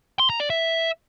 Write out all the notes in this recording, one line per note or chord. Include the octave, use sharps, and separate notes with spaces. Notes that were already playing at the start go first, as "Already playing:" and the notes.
C6
A#5
D5
E5